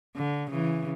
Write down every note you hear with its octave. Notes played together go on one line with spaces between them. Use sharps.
D3
C#3 E3